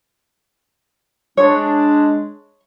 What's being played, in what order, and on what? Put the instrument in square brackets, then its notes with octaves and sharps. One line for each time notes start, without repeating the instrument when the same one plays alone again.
[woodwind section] G#3 D4 [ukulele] C#5